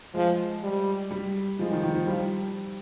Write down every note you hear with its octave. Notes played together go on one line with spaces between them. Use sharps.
F3 G#3
G3
G3
F3 G#3
D#3
D#3
F3
F3 G3